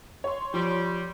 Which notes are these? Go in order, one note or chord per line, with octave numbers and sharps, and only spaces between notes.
C#5 C6
F3 G3